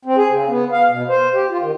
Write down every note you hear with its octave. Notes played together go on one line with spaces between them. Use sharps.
C4
G#4
C#3
B3
F5
B2
C5
G4
F4
D#3